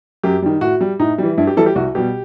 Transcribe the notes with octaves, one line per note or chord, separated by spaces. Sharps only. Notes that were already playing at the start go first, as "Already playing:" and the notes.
F#2 G4
D#3 G3
A2 F#4
G3
A2 D#4
E3 G3
G2 E4
G4
E3 G3 A4
G4
C2 F#4
B2 G3 G4